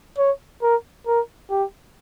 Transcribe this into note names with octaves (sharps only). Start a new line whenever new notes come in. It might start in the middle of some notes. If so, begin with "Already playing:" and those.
C#5
A#4
A#4
G4